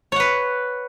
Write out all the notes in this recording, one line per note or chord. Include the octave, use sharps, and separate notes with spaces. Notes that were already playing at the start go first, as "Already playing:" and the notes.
B4 C#5 F#5